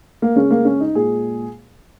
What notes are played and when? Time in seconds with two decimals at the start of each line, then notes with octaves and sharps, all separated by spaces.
0.22 A#3
0.35 C#3 G#3 C#4
0.51 A#3
0.65 C#4
0.80 D#4
0.95 A#2 G#3 G#4